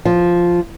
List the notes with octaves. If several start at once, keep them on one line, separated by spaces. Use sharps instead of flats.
F3